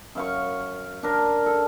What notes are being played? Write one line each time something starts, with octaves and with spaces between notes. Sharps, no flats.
F#2 F5 C#6
D4 A#4
A4